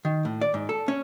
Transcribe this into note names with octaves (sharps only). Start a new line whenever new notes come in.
D#3
A2
D5
G#2
A4
C#4